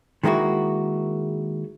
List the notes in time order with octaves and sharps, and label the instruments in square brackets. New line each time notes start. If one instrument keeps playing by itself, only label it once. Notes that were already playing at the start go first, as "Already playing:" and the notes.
[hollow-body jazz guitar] D#3 G#3 A#3 E4 F#4